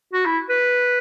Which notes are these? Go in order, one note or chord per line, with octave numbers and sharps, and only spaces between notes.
F#4
E4
B4